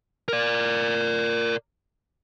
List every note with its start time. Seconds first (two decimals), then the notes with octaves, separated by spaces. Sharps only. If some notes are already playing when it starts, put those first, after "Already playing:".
0.28 A#4 D5